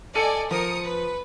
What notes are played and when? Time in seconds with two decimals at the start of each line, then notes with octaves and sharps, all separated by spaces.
0.15 A4 D5 D#5 G#5 C#7 D#7
0.51 F3 A#4 D#6 C#7
0.83 B4